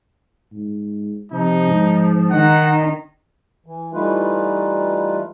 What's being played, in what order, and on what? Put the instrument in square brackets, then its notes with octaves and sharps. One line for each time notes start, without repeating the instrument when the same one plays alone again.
[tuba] G#2
[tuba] C3 [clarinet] F3 [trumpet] D#4
[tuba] G#2
[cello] D#3 D#4 [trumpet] F#5
[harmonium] E3
E3 G3 A3 D#4 F4 B4